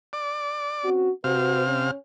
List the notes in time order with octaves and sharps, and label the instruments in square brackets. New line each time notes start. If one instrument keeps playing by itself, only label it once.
[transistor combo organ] D5
[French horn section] C4 C#4 F#4
[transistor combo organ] C3 F5 [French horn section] F#4 B4 C5
[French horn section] C#4